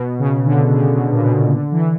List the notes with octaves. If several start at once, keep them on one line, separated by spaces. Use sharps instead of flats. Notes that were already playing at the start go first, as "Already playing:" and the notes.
Already playing: B2
C#3
D3
C#3
B2
A#2
B2
A#2
D3
E3